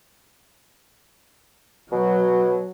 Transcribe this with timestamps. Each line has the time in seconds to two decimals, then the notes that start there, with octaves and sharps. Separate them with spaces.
1.92 B2 F#3